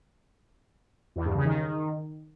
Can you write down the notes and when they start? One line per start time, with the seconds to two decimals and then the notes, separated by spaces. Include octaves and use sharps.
1.16 E2
1.25 G2
1.35 C#3
1.45 D#3